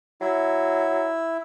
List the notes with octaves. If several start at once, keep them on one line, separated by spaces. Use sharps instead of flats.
F#3 E4